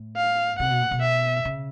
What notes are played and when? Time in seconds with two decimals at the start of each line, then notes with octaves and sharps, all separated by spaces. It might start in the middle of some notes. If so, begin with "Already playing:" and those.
Already playing: A2
0.17 F5
0.59 C3 F#5
0.70 B2
0.81 A#2
0.91 B2
1.02 E5
1.45 C#3